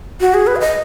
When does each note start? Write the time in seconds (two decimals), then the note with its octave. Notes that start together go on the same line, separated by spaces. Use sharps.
0.21 F#4
0.34 G#4
0.47 B4
0.56 F5
0.60 D#5